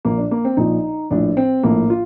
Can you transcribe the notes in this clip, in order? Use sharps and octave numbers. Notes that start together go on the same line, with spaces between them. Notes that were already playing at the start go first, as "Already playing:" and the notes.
A#1 A#2 F3 A#3
D4
A#3
C4
A#1 A#2 F3 D#4
A#1 A2 F3 D4
C4
A#1 A2 F3 A#3
F4